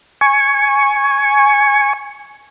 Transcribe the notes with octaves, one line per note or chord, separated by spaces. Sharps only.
G#5 C#6